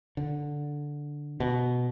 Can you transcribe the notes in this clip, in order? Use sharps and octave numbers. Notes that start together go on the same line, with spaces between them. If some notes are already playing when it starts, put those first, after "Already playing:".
D3
B2